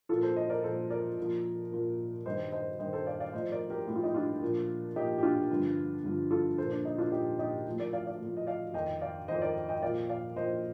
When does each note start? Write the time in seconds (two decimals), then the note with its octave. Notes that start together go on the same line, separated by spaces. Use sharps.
0.09 A#2 F3 F4 A4
0.23 A4 C5
0.36 C5 D#5
0.50 A#4 D5
0.64 A#2 F3 A4 C5
0.90 A#4 D5
1.17 A#2 F3
1.72 A#2 F3
2.25 G2 D#3 C5 D#5
2.52 C5 D#5
2.79 G2 D#3 C5 D#5
2.93 A4 C5
3.07 D5 F5
3.20 D5 F5
3.33 A2 F3 C5 D#5
3.52 A#4 D5
3.70 G4 A#4
3.88 A2 F3 G4
3.96 F4
4.03 D#4 G4
4.14 D4 F4
4.42 A#2 F3
4.96 A#2 F3 D#4 G4
5.18 G4
5.23 D4 F4
5.51 G2 D3 F3
6.04 G2 D3 F3
6.31 F4 A4
6.58 A#2 F3 A4 C5
6.71 D4
6.85 D#4
6.98 D4 F4
7.12 A#2 F3 D#4 G4
7.39 D#4 G4
7.66 A2 F3
7.79 A#4 D5
7.93 D5 F5
8.07 D5 F5
8.20 A2 F3
8.37 D#5
8.47 D5 F5
8.74 F2 D#3 D#5 G5
9.01 D5 F5
9.28 F2 D#3 C5 D#5
9.42 A#4 D5
9.69 D#5 G5
9.82 A#2 F3 D5 F5
10.09 D5 F5
10.36 A#2 F3 C5 D#5